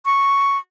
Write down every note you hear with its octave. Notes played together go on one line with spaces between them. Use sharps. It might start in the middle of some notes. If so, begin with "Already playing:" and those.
C#6